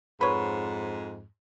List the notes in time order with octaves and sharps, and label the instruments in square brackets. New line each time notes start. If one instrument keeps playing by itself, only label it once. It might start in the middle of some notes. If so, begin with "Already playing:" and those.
[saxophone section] F2 G#2 [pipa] B4 C#5